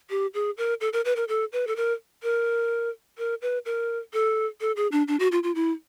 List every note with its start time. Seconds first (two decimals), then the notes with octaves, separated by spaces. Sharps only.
0.10 G4
0.34 G#4
0.57 A#4
0.81 A4
0.93 A#4
1.05 B4
1.16 A#4
1.28 A4
1.52 B4
1.67 A4
1.76 A#4
2.23 A#4
3.18 A#4
3.42 B4
3.65 A#4
4.13 A4
4.61 A4
4.76 G#4
4.92 D4
5.08 D4
5.19 F#4
5.32 F4
5.43 F4
5.55 E4